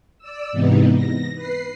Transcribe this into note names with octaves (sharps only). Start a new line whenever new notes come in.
D5 E6
G#2 C3 E3 B3 D#4
A#6
B4 C7